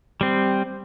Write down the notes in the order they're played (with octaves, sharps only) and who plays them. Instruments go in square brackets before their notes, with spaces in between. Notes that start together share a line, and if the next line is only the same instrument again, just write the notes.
[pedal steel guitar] G3 C4